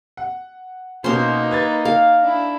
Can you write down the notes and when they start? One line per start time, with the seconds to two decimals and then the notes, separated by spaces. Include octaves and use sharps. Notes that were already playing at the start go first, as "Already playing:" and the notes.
0.17 F#5
1.04 B2 A#3 C#4 D#4 C5 C6
1.51 B4 G#6 A6
1.85 A#4 F5
2.22 D4 E4